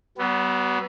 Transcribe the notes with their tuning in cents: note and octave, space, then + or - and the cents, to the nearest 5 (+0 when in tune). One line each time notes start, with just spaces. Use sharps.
F#3 +45 B3 +0